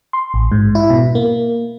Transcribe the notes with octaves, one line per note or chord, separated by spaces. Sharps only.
C6
A1
G#2
E4
B2
A#3